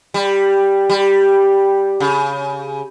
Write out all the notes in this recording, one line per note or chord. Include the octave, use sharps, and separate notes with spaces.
G3
G3
C#3